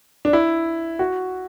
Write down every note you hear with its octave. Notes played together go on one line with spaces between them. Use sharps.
D4
E4
F#4